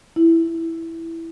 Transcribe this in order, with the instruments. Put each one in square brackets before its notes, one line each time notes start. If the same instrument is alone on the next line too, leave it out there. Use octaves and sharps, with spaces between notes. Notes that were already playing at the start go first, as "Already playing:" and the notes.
[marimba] E4